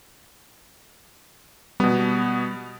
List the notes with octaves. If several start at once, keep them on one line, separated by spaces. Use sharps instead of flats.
B2 G3 B3